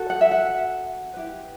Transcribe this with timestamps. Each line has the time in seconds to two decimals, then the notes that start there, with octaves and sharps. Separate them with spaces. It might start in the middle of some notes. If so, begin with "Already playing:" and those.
Already playing: F#4 A4
0.10 F#5
0.21 E5
0.31 F#5
1.13 E4 G4 B4